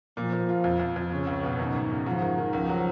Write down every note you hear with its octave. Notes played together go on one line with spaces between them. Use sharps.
A#2 F3
A#2
F4
F2
F2
F2
C#3 C#4
C#2
B2
F#2 D#3
G#1
C#3
G#2 F3
D#3
D#3
C#2 F3
F#3